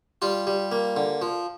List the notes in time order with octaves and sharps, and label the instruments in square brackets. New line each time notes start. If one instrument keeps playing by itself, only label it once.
[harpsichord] G3 F4
G3
A#3
D3
F3